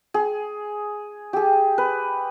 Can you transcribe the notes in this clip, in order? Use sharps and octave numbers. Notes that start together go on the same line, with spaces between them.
G#4
G4 G#4
B4